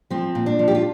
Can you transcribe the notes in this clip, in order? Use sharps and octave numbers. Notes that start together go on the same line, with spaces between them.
F3 C4
A#2
D4
F3
G4
F4